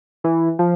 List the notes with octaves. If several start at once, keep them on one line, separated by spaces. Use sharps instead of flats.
E3
F3